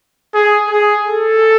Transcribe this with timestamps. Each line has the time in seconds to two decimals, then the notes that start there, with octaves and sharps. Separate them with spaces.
0.34 G#4
0.71 G#4
1.06 A4